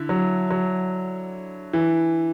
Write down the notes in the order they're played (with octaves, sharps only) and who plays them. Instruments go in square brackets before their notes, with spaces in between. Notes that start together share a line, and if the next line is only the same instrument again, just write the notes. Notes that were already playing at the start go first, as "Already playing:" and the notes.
Already playing: [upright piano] D3 E4
[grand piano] F#3
F#3
E3